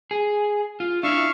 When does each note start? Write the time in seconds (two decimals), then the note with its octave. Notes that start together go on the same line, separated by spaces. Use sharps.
0.11 G#4
0.80 F4
1.03 D4 E4 E5 F5 C#6